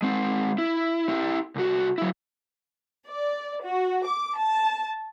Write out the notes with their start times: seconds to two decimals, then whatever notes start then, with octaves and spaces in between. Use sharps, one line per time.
0.02 G#3 C4
0.58 E4
1.09 E4 G4
1.56 C2 F#4
1.98 F#3 E4
3.06 D5
3.62 F#4
4.06 D6
4.38 A5